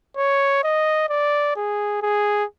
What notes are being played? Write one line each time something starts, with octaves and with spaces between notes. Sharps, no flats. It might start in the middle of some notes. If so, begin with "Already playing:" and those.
C#5
D#5
D5
G#4
G#4